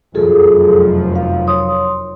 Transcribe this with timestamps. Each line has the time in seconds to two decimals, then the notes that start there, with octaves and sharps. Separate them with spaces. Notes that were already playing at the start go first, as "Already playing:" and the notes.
0.15 F1 F#2 F3 F4 G#4 A4
1.16 F5
1.47 C#5 C6 D#6